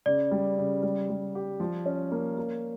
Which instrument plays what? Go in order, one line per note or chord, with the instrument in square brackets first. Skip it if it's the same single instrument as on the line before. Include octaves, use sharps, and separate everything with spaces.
[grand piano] C#3 [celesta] D5
[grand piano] G3
C#3
G3
G3
G4
F3
C#4
A#3
A#3